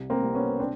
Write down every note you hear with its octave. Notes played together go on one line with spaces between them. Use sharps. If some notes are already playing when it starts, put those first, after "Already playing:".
Already playing: C2
A#3 C4
C2
B3 C#4
C4 D4